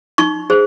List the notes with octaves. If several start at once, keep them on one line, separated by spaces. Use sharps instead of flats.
D#4 C#6
G#4 C5